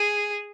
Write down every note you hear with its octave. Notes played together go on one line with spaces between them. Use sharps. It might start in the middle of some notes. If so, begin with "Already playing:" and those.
Already playing: G#4